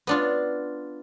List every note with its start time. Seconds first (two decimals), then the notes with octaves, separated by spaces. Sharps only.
0.07 B3 D4 F4